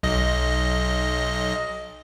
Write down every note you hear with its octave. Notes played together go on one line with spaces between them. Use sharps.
B1 D#5